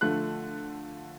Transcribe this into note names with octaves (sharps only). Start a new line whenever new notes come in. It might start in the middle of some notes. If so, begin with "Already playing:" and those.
D3 F3 A3 F#6